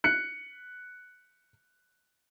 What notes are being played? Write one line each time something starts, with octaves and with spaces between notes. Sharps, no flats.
F#6 C#7